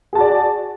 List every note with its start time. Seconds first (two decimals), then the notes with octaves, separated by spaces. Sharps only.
0.13 G#4
0.15 A5
0.18 F#4
0.21 D5